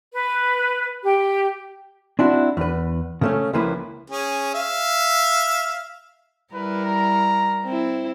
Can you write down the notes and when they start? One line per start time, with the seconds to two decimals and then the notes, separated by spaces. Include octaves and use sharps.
0.12 B4
1.02 G4
2.19 C4 D4 E4 F#4
2.57 E2 B4
3.21 C#3 A3 C#4
3.53 C#2 F3 A#3 E4 B4
4.10 C#4 G#4
4.54 E5 F5
6.54 G3 E4 A#4 B4
6.85 A#5
7.64 C4 E4